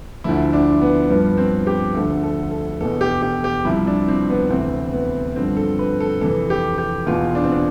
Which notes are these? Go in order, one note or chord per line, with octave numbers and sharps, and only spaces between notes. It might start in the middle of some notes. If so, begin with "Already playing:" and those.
D2 D3 F3 E4
D4
B3
G2 F3 B3
C4
G4
D2 D3 F3 A4
A4
A4
E2 B2 A4
G4
G4
G4
C2 C3 F3 E4
D4
C4
B3
D2 C3 E3 C4
B3
G2 D3 F3 C4
A4
B4
A4
F2 C3 E3 A4
G4
G4
E2 B2 F4
D4
C4
D4